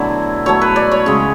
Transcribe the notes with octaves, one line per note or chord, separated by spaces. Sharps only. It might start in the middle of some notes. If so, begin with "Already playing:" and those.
Already playing: B2 D3 F#3 A3 E4 D5
B2 F#3 A3 C#5
B4
D5
C#5
C#3 G#3